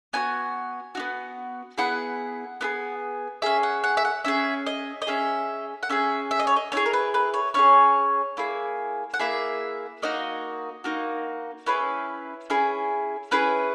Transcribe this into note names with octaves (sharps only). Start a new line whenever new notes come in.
B3 D#4 F#4 G#5
B3 D#4 F#4
B3 E4 G#4 F#5
B3 E4 G#4
C#4 G#4 E5
F#5
F#5
E5
F#5
C#4 G#4 E5
D#5
D#5
C#4 G#4 E5
F#5
C#4 G#4 E5
E5
D#5
C#5
D#5
C#4 E4 G#4 C#5
A#4
B4
B4
C#5
C#4 E4 G#4 C#5
A#3 E4 G#4
F#5
A#3 E4 G#4 E5
A#3 D#4 F#4 D#5
A#3 D#4 F#4
C#4 E4 G#4 B4
C#4 E4 G#4
C#4 E4 G#4 B4